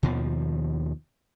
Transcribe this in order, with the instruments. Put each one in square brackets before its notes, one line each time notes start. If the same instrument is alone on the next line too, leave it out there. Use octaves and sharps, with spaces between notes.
[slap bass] D#2 B2 D#3 F3